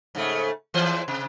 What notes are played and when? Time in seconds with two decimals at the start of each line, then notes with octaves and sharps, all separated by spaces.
0.15 G#2 C#3 A3
0.74 E2 E3 C5
1.08 C3